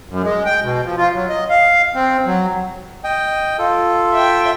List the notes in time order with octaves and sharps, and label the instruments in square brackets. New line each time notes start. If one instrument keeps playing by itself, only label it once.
[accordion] F#2
G#3
G5
B2
F3
F4
F#3
D#5
F5
C4
F#3
[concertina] D#5 G5
F4 A4
[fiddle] E5 G5